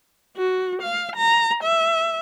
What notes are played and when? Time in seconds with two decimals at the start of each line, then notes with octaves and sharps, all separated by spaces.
0.37 F#4
0.82 F5
1.16 A#5
1.63 E5